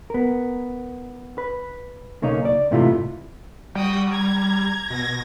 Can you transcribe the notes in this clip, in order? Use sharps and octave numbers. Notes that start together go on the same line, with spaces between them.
B3 A#4
B4
B1 C#3 A#3 C#4 D#4
D5
G#2 C3 E3 A3 E4 F4
G3 F#4 G5 D#6
A#5 G#6
B2 G#6 A#6